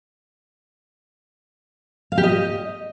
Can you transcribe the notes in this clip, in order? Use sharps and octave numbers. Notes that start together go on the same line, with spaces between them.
F5
G4
D#5